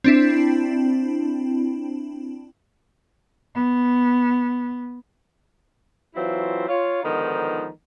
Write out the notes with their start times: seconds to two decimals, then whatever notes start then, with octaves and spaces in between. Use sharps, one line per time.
0.04 C4 D4 E4
3.55 B3
6.15 E3 F#3 C4 E4 F4
6.69 F4 C#5
7.03 G#2 D3 D#3 F3 B3 D#4